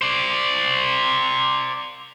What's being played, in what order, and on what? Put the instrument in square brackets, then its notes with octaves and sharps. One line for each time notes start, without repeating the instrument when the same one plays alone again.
[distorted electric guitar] C5 D5